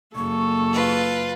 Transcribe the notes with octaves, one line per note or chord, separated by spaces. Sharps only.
F#1 A#3 A4 C#6
F4 B4